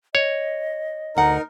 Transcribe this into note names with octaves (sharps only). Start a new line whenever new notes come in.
C#5 D#5
D2 D#4 A#4 F#5